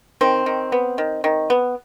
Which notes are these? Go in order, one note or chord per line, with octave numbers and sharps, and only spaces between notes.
D#3 C4
D#3
B3
D#3
D#3
B3